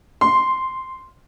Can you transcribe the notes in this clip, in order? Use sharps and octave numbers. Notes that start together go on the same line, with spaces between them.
C6